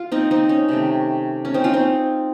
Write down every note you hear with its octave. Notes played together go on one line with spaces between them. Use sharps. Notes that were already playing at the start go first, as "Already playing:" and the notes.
Already playing: F4
C4 D#4
C4 D#4
C#4
C3 D#3 A3
C#4
C4 D#4
C#4 F4
C4 D#4